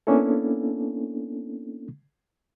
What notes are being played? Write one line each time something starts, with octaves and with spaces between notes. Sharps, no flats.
A#3 B3 C#4 D4 E4 A4